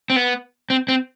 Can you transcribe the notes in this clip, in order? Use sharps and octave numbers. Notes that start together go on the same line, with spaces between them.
C4
B3
C4
C4